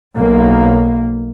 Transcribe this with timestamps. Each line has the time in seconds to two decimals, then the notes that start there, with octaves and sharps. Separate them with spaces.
0.16 B1 A#3